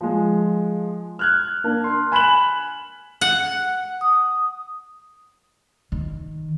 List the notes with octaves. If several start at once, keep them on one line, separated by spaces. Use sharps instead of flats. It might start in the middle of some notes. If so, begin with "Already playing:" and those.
F3 G#3
F6 F#6 G#6
A#3 D4
C6
G#5 B5 F#6 E7 F#7
F#5
D#6
D#3